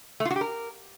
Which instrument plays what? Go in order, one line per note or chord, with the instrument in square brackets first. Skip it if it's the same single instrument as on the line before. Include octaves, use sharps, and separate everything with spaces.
[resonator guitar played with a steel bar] A3
F4
F#4
G4
A#4